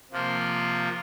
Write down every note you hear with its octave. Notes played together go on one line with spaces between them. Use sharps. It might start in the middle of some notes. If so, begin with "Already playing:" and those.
C3 F3 A#3 F4